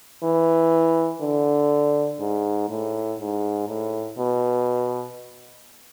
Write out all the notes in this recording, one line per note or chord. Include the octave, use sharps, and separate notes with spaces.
E3
D3
G#2
A2
G#2
A2
B2